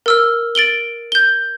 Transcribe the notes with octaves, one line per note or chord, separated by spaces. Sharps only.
A#4 E6 F6
A6 D7 F#7 G7
G6 G7